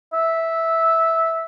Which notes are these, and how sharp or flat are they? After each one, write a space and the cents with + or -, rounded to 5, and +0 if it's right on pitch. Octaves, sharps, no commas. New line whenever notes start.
E5 -10